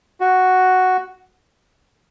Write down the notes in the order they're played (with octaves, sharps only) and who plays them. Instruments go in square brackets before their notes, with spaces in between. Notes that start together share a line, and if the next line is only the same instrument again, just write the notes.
[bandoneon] F#4